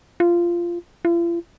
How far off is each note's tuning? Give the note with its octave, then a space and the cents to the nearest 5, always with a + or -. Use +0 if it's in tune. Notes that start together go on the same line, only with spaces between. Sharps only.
F4 -15
F4 -45